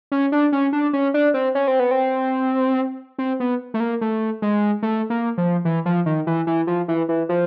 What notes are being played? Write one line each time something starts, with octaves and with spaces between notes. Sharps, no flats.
C#4
D4
C#4
D4
C#4
D4
C4
C#4
C4
B3
C4
C4
B3
A3
A#3
A3
G#3
A3
A#3
F3
E3
F3
D#3
E3
E3
F3
E3
E3
F3